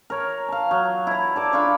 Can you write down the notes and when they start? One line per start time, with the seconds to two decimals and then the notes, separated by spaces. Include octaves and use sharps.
0.10 A#4 C#5
0.49 F5 A5
0.71 F#3
1.07 E4 A#5
1.36 A4 D5 D6
1.53 D4 F4 B5 C#6